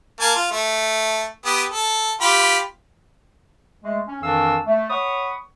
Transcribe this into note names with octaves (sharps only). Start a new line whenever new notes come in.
A#3 G#5 A5
F4
A3
B3 G4 D#6
A4
F4 G4 B5
G#3 A3
C#4
F2 D#3 E3 D4 F5 E6
A3
C#5 F#5 B5 C#6 D#6